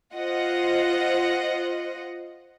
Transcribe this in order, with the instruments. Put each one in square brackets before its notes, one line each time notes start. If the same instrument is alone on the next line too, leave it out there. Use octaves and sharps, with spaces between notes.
[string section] F4 C5 D#5 F#5